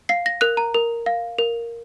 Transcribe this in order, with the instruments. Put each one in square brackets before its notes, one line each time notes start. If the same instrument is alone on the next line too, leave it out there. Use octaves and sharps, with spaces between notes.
[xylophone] F5 C7
A#6
A#4 F#6
A#5
A#4
F5
A#4